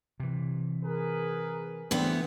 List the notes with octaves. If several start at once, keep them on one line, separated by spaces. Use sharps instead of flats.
C3 E3
G#4 A#4 B4
D3 E3 G3 A3 B3 C4